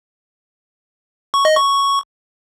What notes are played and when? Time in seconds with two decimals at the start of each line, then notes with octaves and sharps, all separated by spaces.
1.34 C#6
1.45 D#5
1.56 C#6